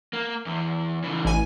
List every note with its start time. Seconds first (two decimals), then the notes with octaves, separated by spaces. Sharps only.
0.13 A#3
0.46 E2
1.04 C#3 E3
1.25 A1 G#5